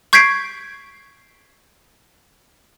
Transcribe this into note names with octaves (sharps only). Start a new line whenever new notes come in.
C#6 G6 G#6 B6 C7 D7